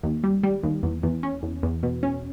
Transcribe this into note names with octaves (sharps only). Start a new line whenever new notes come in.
D#2
G3
G3
D#2
E2
E2
C#4
E2
E2
B2
C#4